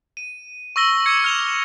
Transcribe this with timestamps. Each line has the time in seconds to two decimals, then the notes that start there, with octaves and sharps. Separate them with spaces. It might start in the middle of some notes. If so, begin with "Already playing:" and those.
0.17 D#7
0.76 C#6 E6 A#6 G7
1.06 D6 E6 G#6 C#7
1.24 F6 F7 G7